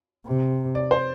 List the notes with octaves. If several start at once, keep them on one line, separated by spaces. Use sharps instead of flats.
C3
D5
C5